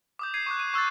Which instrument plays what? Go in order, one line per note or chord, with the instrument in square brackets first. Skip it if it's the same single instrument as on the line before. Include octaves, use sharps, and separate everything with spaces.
[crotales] D6 D#6 G6
G#6 C7 D#7
C#6 D6 F#6
D#7
C#6 E6 F#6 A6